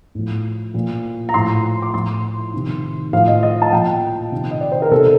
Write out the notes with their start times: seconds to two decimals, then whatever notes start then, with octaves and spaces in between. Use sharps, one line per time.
0.15 A2 F3
0.74 A#2 F3
1.29 A#5
1.34 A2 F3 C6
1.82 D6
1.93 A2 F3 C6
2.53 C3 D#3
3.13 A2 F3 F5
3.28 D#5
3.43 D#5
3.62 A5
3.72 A#2 F3 G5
4.32 C3 D#3
4.51 D#5
4.61 D5
4.72 C5
4.82 A#4
4.91 C3 D#3 A4